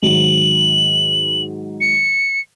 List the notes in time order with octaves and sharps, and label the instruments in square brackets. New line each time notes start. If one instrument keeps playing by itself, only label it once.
[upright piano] G#2 D#3 F#3 [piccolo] F#7
[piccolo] C#7